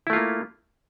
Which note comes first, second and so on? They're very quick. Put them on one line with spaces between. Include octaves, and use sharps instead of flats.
E4 A3 F4 A#3